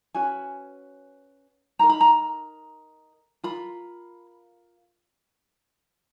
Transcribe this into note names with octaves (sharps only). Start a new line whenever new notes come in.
C#4 F#4 B4 G#5
D#4 A#4 A#5
B5
A#5
F4 A#4 B5